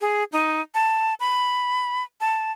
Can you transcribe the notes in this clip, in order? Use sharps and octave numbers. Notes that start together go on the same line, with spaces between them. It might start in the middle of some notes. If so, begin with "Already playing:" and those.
G#4
D#4
A5
B5
A5